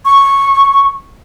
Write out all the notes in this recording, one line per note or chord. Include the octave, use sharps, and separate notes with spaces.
C#6